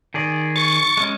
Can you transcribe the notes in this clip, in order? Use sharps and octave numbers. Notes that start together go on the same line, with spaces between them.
D#3 G#4 D5
C#6 A6
G#3 C#4